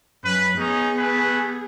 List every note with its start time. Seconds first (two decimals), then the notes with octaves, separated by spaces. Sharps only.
0.24 F#2 B4
0.58 B3 C#4 D#4 G#4
0.98 A3 B4